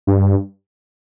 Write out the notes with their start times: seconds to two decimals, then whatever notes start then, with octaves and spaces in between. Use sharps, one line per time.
0.07 G2